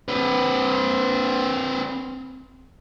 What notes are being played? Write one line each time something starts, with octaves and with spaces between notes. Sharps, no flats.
C4 B4